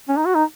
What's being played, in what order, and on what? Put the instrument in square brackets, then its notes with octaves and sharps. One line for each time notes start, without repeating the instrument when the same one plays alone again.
[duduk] C#4
D#4
F#4
D#4